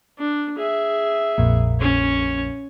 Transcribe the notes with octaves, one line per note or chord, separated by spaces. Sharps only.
D4
G#4 E5
A#1 F2 A#2
C#4 C#5